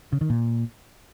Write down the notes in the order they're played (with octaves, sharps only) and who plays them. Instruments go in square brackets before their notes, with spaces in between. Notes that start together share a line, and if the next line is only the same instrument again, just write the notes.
[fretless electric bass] C#3
D#3
A#2